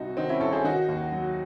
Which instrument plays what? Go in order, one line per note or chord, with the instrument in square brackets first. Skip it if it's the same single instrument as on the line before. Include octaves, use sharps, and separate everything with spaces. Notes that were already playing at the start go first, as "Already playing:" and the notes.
Already playing: [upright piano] C2 C3 D#4 F#4
D#3 C4 D#4
C#4 E4
C2 A4 C#5
G#4 C5
D#3 D#4 F#4
D#2
F#3